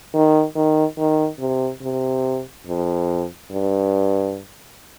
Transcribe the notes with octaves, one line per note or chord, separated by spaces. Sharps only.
D#3
D#3
D#3
C3
C3
F2
G2